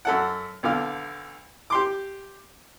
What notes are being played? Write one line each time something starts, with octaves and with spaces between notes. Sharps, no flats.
F#2 A4 F#5
B1 D3 F5
G4 C6 D6